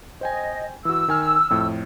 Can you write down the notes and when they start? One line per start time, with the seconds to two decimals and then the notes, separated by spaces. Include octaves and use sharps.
0.21 C5 D#5 G5 G#5
0.85 E3 F#4 E6
1.08 D#3 G#5 F6
1.50 F2 A2